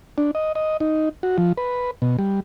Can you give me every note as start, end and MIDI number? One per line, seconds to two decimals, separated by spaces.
0.18 0.31 62
0.35 0.52 75
0.55 0.77 75
0.80 1.09 63
1.23 1.37 66
1.38 1.53 53
1.58 1.91 71
2.02 2.17 47
2.19 2.40 55